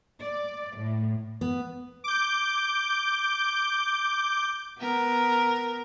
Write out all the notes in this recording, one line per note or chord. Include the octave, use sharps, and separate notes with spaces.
D5
A2
B3
D6 G6
B3 A#4